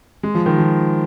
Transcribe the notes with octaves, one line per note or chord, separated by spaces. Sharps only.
G#3
F3
D#3
F3